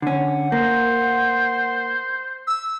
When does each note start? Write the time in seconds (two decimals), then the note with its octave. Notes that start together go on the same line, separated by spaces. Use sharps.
0.02 D3 C#4 F#5
0.52 A#3 C5
2.47 E6